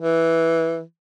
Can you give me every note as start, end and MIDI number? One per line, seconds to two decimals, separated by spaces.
0.01 0.82 52